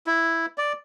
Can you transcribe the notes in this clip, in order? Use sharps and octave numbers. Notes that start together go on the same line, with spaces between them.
E4
D5